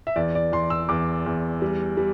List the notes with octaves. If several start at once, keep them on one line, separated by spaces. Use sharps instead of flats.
E5
E2 D5
D5
E2 C6
E6
E2 D6
E2
G3
G3